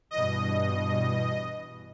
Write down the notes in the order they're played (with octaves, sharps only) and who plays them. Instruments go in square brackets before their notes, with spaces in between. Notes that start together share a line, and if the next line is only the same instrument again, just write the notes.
[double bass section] G2 B2 E3 [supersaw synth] D#5